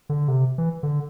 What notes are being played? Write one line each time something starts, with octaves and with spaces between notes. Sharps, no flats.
D3
C3
E3
D3